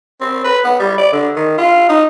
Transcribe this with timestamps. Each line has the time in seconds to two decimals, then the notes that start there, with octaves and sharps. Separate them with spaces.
0.21 C4
0.44 B4
0.64 B3
0.80 G3
0.98 D5
1.12 D3
1.36 D#3
1.58 F4
1.89 D#4